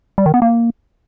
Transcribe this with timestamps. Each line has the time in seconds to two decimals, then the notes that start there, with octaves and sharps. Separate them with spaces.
0.18 G3
0.26 D#3
0.34 B3
0.42 A#3